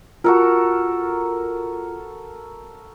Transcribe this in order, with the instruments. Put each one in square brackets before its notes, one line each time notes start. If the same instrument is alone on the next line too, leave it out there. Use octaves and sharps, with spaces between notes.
[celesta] F4 [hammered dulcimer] F#4 A4 A#4